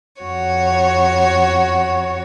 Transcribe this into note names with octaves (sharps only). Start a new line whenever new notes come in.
F2 F#4 C#5